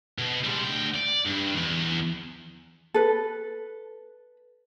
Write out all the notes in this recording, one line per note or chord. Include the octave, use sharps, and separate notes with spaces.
B2
G3 G#3
D2 G5
D5
G2
E2
A4 B4